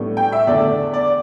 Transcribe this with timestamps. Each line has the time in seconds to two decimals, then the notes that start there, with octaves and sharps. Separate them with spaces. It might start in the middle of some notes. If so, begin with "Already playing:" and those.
Already playing: A2 G3 B3 D4
0.17 G5
0.32 E5
0.47 E2 D3 A3 D4 D5
0.94 D5